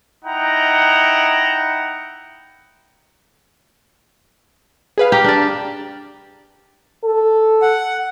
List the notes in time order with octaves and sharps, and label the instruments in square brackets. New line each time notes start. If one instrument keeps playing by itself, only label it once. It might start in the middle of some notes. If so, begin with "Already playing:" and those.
[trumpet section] D#4 E4 F#5 G5 A#5
[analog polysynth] G#4 B4 F5
[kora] G4 [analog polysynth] A#5 F6
[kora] D4 D5
[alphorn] A4
[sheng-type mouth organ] F#5